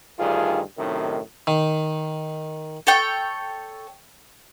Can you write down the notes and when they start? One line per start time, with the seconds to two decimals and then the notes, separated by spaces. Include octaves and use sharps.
0.19 D2 G2 D#3 F4 G#4
0.77 F#2 A2 C3 D#3
1.47 D#3
2.87 A4 C#5 G5